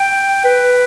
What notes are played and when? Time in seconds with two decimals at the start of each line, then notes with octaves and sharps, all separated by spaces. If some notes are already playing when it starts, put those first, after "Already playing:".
Already playing: G5
0.44 B4